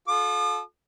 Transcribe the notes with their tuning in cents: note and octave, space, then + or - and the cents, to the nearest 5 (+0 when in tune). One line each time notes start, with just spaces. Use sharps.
F4 +35 A4 -30 D#6 -45